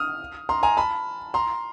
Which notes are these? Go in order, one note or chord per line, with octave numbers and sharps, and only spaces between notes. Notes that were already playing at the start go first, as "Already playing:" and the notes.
Already playing: D#6 F6
A#5 C6
G#5 A#5
A5 B5
A#5 C6